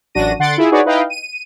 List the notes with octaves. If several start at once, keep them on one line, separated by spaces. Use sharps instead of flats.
A1 F#2 D4 F#4 A#6 D#7
D3 F#5 C6 A6 D7
E4 F4 G#4
D#4 F#4 G#4 B4 C#5 D5
D#4 E4 B4 D#5 F5 G5
D#7